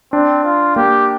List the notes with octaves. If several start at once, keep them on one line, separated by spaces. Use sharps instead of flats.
C4 D4
F4
A#3 G4